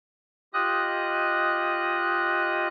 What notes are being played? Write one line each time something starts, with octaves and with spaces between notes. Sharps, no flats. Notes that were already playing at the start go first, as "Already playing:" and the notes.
F4 G4 D#5 D#6 F#6